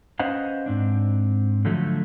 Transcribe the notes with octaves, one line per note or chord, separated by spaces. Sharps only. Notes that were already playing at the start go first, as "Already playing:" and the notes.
C#4 B4 C5 D#5 F5 F#5
G#2 C4 D4
D3 F3 F#3 A3